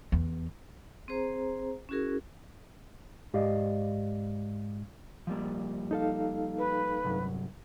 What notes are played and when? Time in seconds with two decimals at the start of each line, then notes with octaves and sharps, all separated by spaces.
0.12 E2
1.08 C4 G#4 C5 A#5
1.89 C#4 E4 F#4 G#4 A#4
3.34 G#2 G4 D5 D#5 F5
5.27 F3 G3 A#3
5.91 D#4 A4 F5
6.58 B4
7.04 C2 G2 F#3